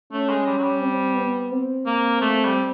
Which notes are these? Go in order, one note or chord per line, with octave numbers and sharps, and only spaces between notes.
A3 C#4
G#3
G3
F#3
G3
C4
B3
C4
A#3
A3
G3